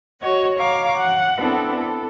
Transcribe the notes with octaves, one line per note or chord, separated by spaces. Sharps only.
F#4 C#5 D#5 F#5
C#5 F5 A#5 D6
F#5
B3 C4 D4 E4 A4
A4